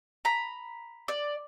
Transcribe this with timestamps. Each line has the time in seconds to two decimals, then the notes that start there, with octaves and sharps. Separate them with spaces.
0.25 A#5 B5
1.08 D5